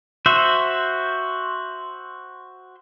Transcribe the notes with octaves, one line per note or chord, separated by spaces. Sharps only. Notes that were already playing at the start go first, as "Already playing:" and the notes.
F#4 C5 E5